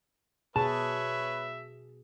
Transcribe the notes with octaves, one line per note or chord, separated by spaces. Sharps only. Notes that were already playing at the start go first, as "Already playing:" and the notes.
B2 G#4 B4 C#5 E5 A5